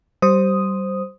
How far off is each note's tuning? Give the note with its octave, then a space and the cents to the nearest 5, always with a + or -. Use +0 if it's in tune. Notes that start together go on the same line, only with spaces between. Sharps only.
G3 -25 C5 +0 D#6 +0